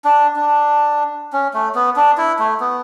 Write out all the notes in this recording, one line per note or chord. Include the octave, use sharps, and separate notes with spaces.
D4
D4
C#4
A3
B3
D4
E4
A3
B3